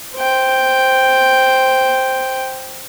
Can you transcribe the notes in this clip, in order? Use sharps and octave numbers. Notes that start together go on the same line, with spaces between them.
C5 G5